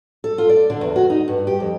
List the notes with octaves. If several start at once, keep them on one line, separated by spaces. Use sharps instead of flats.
A4
F4
D5
D3
E2
F#4
D#4
G2
G4
F2